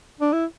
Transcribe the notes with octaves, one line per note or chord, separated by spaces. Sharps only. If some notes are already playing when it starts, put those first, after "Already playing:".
D4
E4